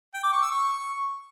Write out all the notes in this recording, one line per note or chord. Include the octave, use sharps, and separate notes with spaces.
G5
D6
C#6
E6
C#6